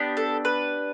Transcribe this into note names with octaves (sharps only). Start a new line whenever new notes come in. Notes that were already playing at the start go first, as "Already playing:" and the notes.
Already playing: B3 D4 G4
A4
B4